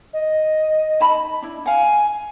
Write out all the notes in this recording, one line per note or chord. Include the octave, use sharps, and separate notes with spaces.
D#5
D#4 A5 B5
D4 E4
F5 F#5 G#5